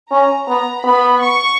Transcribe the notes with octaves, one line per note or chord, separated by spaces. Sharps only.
C#4 A#5
B3 A#5
B3 B5
C#6